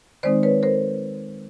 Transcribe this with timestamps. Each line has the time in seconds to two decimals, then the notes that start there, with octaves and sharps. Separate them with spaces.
0.23 D#3 G#3 C4 D#4 C5 D5
0.43 B4 C#5
0.63 A#4 C5